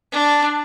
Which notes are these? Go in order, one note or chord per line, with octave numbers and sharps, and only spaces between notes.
D4